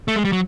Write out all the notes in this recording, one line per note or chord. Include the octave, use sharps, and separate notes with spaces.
A3
G#3
G3
F#3